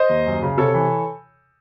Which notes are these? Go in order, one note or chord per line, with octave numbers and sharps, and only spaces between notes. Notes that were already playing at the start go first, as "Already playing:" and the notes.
Already playing: C5 D#5
D#2
F#2
C#3
C3 A4 C#5
E3